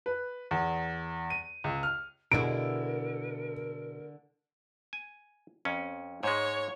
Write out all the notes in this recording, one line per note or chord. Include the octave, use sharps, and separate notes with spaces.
B4
E2
D#7
C#2
F6
B2 D3 G#3 E4 A#4 D7
G#5
F2 C#4
G#2 G#3 C#5